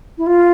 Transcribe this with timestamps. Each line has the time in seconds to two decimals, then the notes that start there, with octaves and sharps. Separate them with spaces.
0.18 E4
0.26 F4